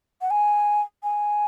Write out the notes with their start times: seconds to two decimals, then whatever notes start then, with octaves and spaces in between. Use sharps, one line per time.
0.21 F#5
0.30 G#5
1.03 G#5